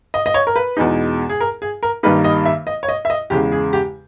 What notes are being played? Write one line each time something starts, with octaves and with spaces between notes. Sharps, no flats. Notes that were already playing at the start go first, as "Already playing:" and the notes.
D#5
D#5
C#5
A#4
B4
E2 B2 G#3 D#4
G#4
A#4
G#4
A#4
G2 D#3 G3 A#3 D#4 B4
D#5
E5
D#5
C#5
D#5
E5
D#5
E2 C#3 G#3 G4
G#4
G4